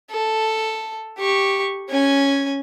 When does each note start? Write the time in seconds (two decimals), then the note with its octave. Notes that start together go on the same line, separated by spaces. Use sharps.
0.11 A4
1.19 G4 C#6
1.89 C#4 G#5